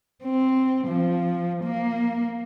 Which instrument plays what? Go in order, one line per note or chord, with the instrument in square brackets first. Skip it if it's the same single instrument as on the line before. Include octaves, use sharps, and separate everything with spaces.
[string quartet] C4
F3
A#3